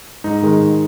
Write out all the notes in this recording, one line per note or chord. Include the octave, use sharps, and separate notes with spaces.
G#2 D#4
D#3 G#3
G#2